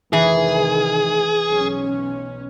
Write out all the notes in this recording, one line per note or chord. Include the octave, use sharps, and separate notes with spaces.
F1 D#3 E3 G#4
B1 C#4